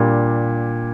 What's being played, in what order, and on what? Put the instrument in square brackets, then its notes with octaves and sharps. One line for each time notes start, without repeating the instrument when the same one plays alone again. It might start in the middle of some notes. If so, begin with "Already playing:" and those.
Already playing: [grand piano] A#2 G3 D4 G4